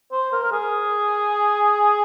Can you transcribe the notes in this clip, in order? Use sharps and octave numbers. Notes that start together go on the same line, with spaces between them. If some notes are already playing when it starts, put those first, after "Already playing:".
C5
A#4
A#4
G#4